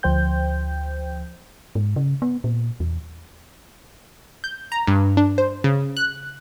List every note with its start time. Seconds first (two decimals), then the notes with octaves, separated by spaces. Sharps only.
0.03 D2 F3 C5 G5 G6
1.75 G#2
1.96 C#3
2.22 B3
2.44 A#2
2.80 E2
4.44 G6
4.72 A#5
4.87 G2
5.17 D4
5.38 C5
5.64 C#3
5.97 F#6